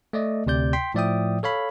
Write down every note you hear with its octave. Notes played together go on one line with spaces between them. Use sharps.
A3 D5 D#5
D2 C3 D5 G6
G5 C6 B6
A2 F3 D5 E5 G5 D#6
A4 C#5 F5 B5